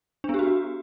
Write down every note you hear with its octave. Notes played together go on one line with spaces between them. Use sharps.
B3 D4 F#4 G4